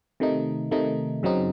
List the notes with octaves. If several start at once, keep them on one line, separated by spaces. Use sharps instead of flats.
C3 D#3 A3 D#4
C3 D#3 A3 D#4
F#2 C#3 F#3 C4 D#4